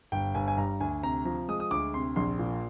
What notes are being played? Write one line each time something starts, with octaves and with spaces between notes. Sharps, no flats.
G1 G5
G1 G#5
G#5
G2 A#5
D2 G#5
C3 A#5
F3 A#5
G#3 D#6
D#6
D2 D6
C3 C6
A#1 C6
A#2